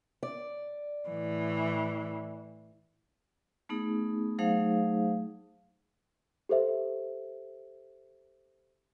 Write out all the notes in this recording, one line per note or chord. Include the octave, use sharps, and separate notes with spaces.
D5
A2 E3
A3 B3 D#4 G#4
F#3 A3 D#4 G#4 C5 F5
G4 A4 C5 E5